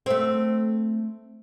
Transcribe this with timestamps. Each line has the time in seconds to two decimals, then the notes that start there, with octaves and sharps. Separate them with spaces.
0.06 A3 C4